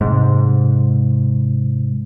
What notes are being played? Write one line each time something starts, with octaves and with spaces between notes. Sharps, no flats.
G#2 C3